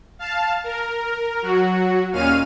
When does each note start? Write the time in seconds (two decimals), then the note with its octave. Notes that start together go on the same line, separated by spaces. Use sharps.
0.19 F5 A5
0.64 A#4
1.42 F#3 F#4
2.12 D#2 A#2 C#4 F5 F6 D#7